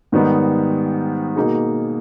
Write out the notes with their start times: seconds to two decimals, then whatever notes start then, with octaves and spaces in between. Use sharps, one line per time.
0.12 G#2 D#3 G3 B3 D#4
1.36 B2 A#3 D#4 G#4